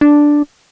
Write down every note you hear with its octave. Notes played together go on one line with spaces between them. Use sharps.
D4